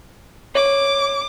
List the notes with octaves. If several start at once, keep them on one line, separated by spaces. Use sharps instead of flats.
C#5 D6